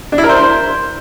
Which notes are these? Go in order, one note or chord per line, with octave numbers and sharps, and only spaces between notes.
D4
E4
A#4
C5